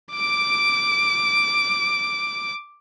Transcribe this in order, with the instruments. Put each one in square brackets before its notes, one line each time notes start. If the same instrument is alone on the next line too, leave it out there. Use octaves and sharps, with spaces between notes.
[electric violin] D6 D7